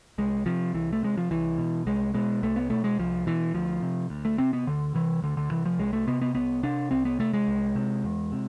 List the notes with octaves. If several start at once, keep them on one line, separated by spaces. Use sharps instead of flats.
C2 G#3
C3 F3
C2 E3
A3
C3 G#3
F3
C2 E3
B2
C2 G#3
B2 G#3
C2 A3
B3
B2 A3
G#3
C2 F3
B2 E3
D2 F3
C3
D2
A3
C3 C4
B3
D2 D3
C3 E3
D2 D3
D3
C3 E3
F3
C2 G#3
A3
C3 B3
B3
C2 B3
C3 D4
C2 C4
B3
C3 A3
G#3
C2
C3
E2
C3